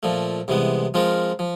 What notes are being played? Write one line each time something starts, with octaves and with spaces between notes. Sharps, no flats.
A#2 F3 A3
C2 C3 E3 G#3 B3
F3 G#3 C4 F4 A#4
F3